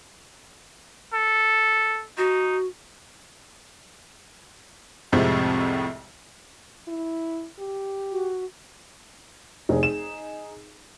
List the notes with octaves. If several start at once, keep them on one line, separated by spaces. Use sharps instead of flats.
A4
D#4 F#4
C2 F2 A2 C3 F3 G#3
E4
G4
F#4
F1 D#4 G#4
E7